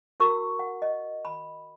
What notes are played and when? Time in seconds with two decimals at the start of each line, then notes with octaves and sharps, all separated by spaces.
0.20 E4 F#4 A#4 C#6 E6
0.59 F#5
0.82 D#5
1.25 B5